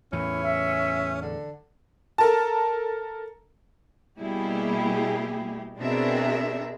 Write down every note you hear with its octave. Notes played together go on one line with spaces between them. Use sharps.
E2 A2 E3 C#4 E4
E5
D3
A4 A#4 A5
B2 G3 A#3 E4 G4 G#4
B2 C4 D4 G#4 A#4 E5